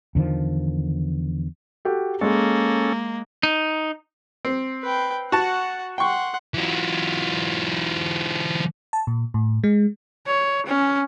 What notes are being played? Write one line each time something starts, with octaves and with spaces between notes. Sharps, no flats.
E2 D3 D#3 F3
F#4 G4 A4
G#3 A#3 C#4 G#4 A4
D#4
C4
B4 G5
F#4 F#5 A5
F#5 G5 C6 C#6
E3 F#3
A5
A#2
A2
G#3
C#5
C#4